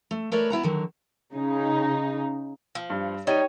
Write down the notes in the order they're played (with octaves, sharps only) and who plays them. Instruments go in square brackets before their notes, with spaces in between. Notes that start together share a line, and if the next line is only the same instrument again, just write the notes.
[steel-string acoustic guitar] A3
A3 A#4 B4 C#5 D5
B3 E4 F#5 A#5
D3 D#3 F#3
[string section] C#3 D#4
[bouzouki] F3
[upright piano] G2
[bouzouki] G3 [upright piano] D#4 D#7 [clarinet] C#5